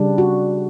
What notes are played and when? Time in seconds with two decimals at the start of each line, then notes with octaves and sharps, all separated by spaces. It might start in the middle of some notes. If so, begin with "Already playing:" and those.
Already playing: C#3 G3 D4
0.18 F#4